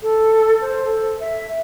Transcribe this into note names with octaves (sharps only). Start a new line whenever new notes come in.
A4
C5
A4
E5